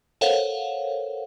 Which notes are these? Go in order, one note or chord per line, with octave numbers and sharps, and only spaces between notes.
A4 A#4 C5 C#5 F5 F#5